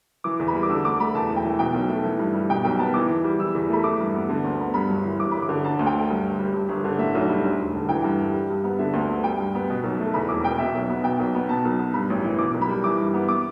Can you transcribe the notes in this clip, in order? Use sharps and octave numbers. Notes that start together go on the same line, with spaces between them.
E3 D6
E2
B5
G3
D6
D3 E6
D2 D6
A3 B5
E2 A5
E1
G5
E3
B2 G5
B1
A3
E3
G2
G3
B2 G5
B1 G5
B3 A5
E3 D6
E2
G3
E3 E6
E2
A3 B5
E3 D6
G2
B3
D3
D2
B3
G2 B5
G1
E3
G2 D6
G1 B5
D6
D3
D3 A5
D2
G5
A3
G2
G1
G3
G2
G1
D3
A2 E5
B1
G3
D2
E1
D3
E3 G5
G2
G3
G3
G2
B3
D3 E5
D2
B3
G3 G5
G2
B3
B2
B1
A3
E2 B5
E1 D6
B2 G5
B2 E5
B1
B3
B2 G5
B1
B3
B2 A5
B1
B3
G2 B5
A1
E3
B2 D6
B1
B5
G3
E3 D6
G2
B3
D6